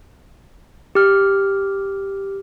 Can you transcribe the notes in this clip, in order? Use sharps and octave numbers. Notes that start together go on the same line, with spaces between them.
G4 F6